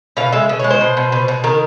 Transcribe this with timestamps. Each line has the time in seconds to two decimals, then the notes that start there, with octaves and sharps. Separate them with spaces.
0.17 B2 F5
0.32 G#3 E5
0.49 B2
0.59 C#5
0.64 G#3
0.70 C5
0.81 B2
0.97 B2
1.12 B2
1.28 B2
1.44 D#3 A#4